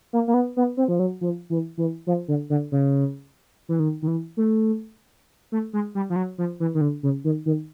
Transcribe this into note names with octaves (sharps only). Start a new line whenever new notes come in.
A#3
A#3
B3
B3
C4
F3
F#3
F3
E3
E3
F3
D3
D3
C#3
E3
D#3
D#3
E3
A3
A3
G#3
G3
F3
F#3
F3
E3
D#3
D3
C#3
D#3
D#3